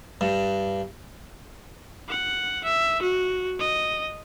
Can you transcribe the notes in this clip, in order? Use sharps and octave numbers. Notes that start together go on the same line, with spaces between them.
G2
F#5
E5
F#4
D#5